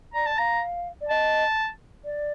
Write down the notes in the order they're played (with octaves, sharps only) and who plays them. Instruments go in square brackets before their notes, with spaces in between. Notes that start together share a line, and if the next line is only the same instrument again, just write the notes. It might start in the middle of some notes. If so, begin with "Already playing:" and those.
[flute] D5 [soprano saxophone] A#5
[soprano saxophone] A5
[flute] F5 [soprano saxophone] A#5
[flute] D5
[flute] D#5 [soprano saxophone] A5
[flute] D5